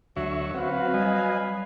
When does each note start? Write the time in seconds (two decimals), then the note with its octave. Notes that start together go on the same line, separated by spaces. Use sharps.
0.16 D2 F#3 E5 C#6
0.54 C4 F#4 B4 F5
0.94 G3 D#5 G#5